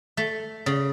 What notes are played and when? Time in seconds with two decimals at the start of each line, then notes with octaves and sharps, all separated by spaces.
0.17 A3
0.66 C#3